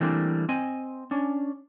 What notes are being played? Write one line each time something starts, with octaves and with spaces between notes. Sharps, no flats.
E3 G3 A3 A#3 C4 D4
C4 D#5 G#5
C#4 D4